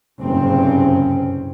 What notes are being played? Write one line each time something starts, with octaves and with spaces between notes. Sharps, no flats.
F#1 C2 G2 A#2 C4 C#4